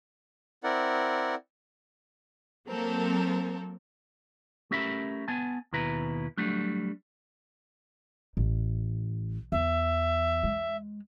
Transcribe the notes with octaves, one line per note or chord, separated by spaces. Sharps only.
C4 E4 A#4 D5 F#5
F#3 A#3 C4 A4 A#4
A3 C#4 G4 A#4 E5 B5
B3 G#5 A5
D#2 B2 E4 B4 A#5
F#3 G3 A3 D4
A1
E2 E5
G#3